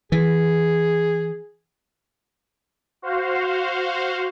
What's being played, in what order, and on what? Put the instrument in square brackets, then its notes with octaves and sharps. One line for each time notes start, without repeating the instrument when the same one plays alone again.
[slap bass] E3 [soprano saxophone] G#4
[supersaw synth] F#4 C5 F5